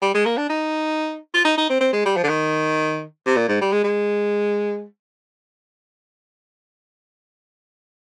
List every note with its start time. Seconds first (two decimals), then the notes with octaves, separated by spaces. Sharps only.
0.02 G3
0.14 G#3
0.26 A#3
0.37 D4
0.50 D#4
1.34 F4
1.45 D#4
1.57 D#4
1.70 C4
1.81 C4
1.93 G#3
2.05 G3
2.17 F3
2.23 D3
2.29 D#3
3.26 C3
3.36 A#2
3.48 G#2
3.61 G3
3.72 G#3
3.84 G#3